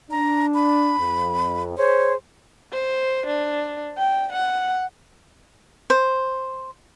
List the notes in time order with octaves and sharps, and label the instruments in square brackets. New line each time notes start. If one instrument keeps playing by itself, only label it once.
[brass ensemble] D4 [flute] A#5
[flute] B5
[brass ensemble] F2
[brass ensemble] G#4 C5 [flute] C#5
[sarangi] C5
D4
G5
F#5
[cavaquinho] C5